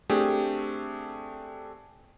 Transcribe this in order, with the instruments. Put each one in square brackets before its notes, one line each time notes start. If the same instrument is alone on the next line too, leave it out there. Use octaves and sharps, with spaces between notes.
[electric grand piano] A3 C4 D4 G4 G#4